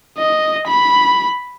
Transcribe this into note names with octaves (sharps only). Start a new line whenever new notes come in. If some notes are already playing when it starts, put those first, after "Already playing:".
D#5
B5